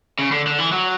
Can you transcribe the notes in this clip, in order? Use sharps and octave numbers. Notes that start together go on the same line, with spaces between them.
C#3
D3
D3
E3
F#3